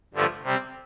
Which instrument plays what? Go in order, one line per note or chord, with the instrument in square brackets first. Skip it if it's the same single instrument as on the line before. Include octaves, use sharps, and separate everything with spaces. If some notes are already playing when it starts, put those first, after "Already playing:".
[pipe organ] G2 D3 F3 A3
C3 G3 C4